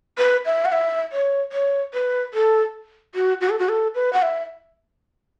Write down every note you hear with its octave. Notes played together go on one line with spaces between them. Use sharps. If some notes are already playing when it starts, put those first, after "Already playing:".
B4
E5
F#5
E5
C#5
C#5
B4
A4
F#4
F#4
A4
F#4
A4
B4
F#5
E5